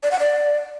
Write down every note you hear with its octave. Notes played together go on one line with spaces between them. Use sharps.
D5
F#5
D5